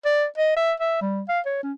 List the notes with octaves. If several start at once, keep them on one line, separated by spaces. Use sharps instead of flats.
D5
D#5
E5
E5
G3
F5
C#5
C#4